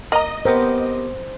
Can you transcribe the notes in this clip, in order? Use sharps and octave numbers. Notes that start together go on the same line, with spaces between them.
A#3 D#5 A#5
B3 G4 A#4 C5